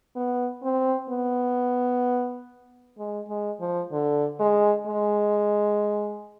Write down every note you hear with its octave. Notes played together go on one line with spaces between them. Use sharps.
B3
C4
B3
G#3
G#3
F3
D3
G#3
G#3